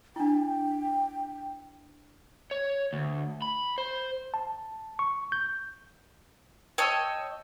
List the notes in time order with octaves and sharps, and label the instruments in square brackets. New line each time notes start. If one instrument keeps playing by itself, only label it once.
[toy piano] D4 E4 [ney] G5
[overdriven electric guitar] C#5
D2
B5
C5
[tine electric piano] A5
C#6
G6
[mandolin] C#5 D#5 [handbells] G5 A5 E6